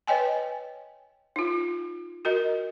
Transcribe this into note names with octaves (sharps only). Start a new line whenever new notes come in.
B4 C#5 D#5 G5 G#5
D#4 F4
F#4 A#4 D#5